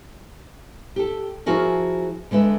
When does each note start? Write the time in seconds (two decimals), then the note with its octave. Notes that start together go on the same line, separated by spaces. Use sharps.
0.96 G4 A4
1.46 F3 E4 F#4 G#4 A#4
2.31 D3 G#3 B4 E5